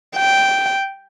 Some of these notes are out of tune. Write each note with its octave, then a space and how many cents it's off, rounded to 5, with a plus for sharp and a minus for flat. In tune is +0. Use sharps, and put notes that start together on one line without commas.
G5 -5